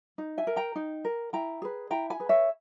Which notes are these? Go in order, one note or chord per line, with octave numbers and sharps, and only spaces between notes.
D#4
E5 G#5
A#4
G5 A#5
D#4
A#4
E4 G5 A#5
G#4 B4
E4 G5 A#5
G#5 B5
G#4 B4
C#5 E5